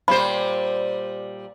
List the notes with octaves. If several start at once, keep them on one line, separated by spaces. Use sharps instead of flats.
A#2 G3 C5 B5